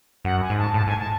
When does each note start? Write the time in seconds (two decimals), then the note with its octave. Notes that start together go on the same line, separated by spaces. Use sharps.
0.25 F#2 F#5
0.42 G#5
0.50 G#2
0.58 A5
0.74 A2 A5
0.86 G#2 G#5
0.99 A5